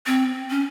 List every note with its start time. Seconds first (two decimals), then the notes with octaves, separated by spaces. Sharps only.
0.07 C4
0.50 C#4